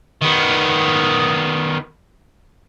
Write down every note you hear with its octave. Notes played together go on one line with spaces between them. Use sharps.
D#3 B3